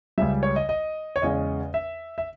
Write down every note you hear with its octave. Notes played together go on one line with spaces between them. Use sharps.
C#2 C#3 G3 E5
C#5
D#5
D#5
C#5
E2 C#3 G#3 C#4 D#5
E5
E5